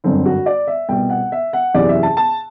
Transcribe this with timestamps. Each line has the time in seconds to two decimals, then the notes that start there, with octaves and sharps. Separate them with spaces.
0.04 G1 F#2 D3 C4
0.26 F#4
0.46 D5
0.67 E5
0.89 C2 B2 G5
1.10 F#5
1.32 E5
1.53 F#5
1.74 F#1 E2 C3 E3 D5
1.89 E5
2.03 A5
2.17 A5